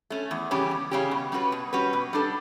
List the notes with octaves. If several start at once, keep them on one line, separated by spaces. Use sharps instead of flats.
A3 C#4
E2
C#3 G3 C#4 G4
E2
C#3 G3 C#4 G4
B2
G3 C#4 F#4 B4
B2
G3 C#4 F#4 B4
B2
G3 D4 A4